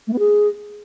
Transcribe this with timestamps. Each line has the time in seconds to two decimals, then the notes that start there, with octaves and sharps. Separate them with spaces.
0.07 A3
0.13 B3
0.19 G#4